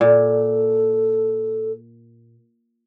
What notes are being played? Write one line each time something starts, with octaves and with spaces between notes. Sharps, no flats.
A#2 A4